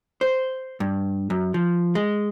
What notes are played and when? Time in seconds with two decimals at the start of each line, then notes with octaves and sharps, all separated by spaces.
0.21 C5
0.80 G2
1.30 F#2
1.54 F3
1.95 G#3